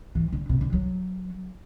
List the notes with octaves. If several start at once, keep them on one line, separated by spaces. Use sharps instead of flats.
E3
D3
C3
D3
F#3